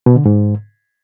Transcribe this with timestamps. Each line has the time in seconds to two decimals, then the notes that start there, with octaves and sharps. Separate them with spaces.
0.06 B2
0.16 D3
0.26 G#2